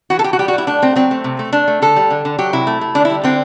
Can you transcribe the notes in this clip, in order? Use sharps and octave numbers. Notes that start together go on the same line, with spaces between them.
E3 F#4
A4
E3 G4
F#4
G3 G4
F#4
G3 E4
A3 D4
A3 C4
F#3 C4
A3
C3
A3
A3 D4
A3
D3 A4
G3
D3
D3
F#3 G4
C3 E4
A3
A3
D3 D4
G3 E4
D3 C4